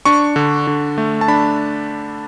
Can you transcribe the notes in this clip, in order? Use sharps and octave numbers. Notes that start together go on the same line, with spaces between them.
D4 C#6
D3
D3
A3
A5
D4 B5